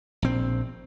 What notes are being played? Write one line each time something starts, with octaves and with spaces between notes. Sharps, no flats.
A#1 C4